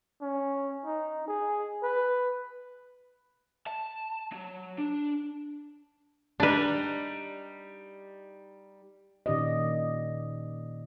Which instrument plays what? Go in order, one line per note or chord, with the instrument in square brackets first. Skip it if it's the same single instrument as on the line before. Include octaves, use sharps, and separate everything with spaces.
[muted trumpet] C#4
D#4
G#4
B4
[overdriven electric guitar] A5
F#3
D4
[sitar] G3 D#4 [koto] D4 B4
[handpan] A#2 D#3 C#4 G4 D5 D#5